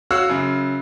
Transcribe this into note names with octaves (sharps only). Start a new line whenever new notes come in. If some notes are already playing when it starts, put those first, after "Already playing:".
F#4 C#5 F5 E6 F#6
F#2 C#3